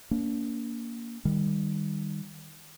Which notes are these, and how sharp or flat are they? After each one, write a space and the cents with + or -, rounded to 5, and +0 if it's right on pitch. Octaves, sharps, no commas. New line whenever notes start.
A#3 +0 D4 -40
D#3 +0 G3 +20